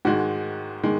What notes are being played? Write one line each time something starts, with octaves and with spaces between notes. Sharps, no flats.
G#2 D#3 G#3 F#4
D#3 G#3